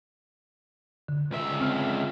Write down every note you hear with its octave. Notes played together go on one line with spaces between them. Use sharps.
D3
C#2 E5
C4 F6